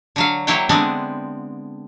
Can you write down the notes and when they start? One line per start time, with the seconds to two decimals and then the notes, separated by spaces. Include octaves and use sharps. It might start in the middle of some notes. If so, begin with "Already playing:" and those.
0.16 D3 F#3 F5
0.47 F#3 A#3 E4 C#5 F5 G5
0.69 D3 G#3 B3 C4 D4